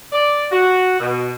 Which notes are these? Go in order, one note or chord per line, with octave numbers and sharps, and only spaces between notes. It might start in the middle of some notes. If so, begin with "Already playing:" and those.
D5
F#4
B2